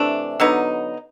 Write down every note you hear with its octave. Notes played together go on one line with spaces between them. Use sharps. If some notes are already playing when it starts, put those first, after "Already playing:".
Already playing: C3 E3 A3 D4
D3 F#3 B3 D#4